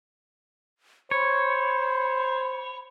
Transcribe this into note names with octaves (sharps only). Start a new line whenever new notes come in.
C5 C#5 B5